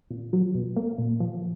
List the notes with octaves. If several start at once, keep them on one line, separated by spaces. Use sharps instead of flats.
A#2
F#3
B2
A#3
A#2
F3